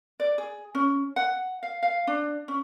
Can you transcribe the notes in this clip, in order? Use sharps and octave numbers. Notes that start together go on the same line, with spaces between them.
D5
G#4
C#4
F#5
F5
F5
D4
C#4